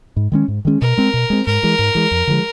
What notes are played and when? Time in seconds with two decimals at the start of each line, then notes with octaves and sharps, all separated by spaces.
0.16 G#2
0.32 D#3 G#3 C#4
0.48 G#2
0.65 D#3 G#3 C#4
0.81 B2 A#4
0.98 G#3 C4
1.14 B2
1.30 G#3 C4
1.46 G#2 A#4
1.63 E3 G#3
1.79 G#2
1.95 E3 G#3
2.11 F2
2.27 D3 F3 G#3